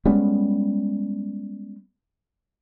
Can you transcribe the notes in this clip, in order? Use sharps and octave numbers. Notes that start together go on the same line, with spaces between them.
G3 G#3 B3 C#4